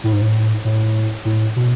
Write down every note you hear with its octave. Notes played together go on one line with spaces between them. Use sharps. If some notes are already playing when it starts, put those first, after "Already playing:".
A2
G#2
A2
A2
A2
B2